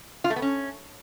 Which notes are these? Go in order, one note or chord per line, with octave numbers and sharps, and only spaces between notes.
F4
A3
B3
C#4